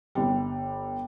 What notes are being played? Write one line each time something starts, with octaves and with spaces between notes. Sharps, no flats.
G1 G3